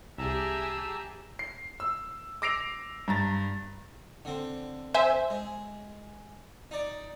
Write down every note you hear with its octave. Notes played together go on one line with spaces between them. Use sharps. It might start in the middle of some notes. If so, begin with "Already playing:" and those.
C2 G4 G#4 E5 A5 A#5 E6
C7
E6
D6 E6 A#6 C7 D7 F7
G2 A#5 A6
D3 C4
C5 E5 G#5
G#3
D#4 D5